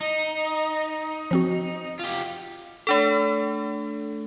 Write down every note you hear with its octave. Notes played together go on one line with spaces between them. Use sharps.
D#4
F3 C4 F#4
F4 G4
A3 D4 A4